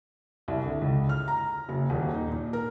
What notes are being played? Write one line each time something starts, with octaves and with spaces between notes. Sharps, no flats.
C2
D3
C#2
F6
A#5
F#1
D#1
D#4
A#2
A#4